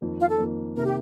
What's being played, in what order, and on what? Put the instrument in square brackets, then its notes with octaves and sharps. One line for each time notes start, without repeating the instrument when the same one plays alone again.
[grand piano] F2 D#3 A#3
[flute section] F4
A4
[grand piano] F2 D#3 A#3
[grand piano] C3 D#3 A#3 [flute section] A#4
[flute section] G4